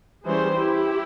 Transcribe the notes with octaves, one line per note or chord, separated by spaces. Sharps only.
E3 G3 C#4 G#4 C5
E4 G4